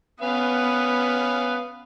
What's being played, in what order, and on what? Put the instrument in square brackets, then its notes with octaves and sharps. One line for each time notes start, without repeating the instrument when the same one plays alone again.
[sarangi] B3 [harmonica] C#4 B4 F5